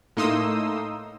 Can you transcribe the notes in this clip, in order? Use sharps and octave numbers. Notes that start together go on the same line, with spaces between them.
A2 A#3 D#4 C6 D#6 E6